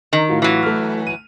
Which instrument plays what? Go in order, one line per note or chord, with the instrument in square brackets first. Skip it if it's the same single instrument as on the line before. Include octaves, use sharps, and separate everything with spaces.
[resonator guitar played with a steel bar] D#3
[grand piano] A2 F4 F#4
[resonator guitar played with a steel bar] E3 F#3
[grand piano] A3 F6
D#7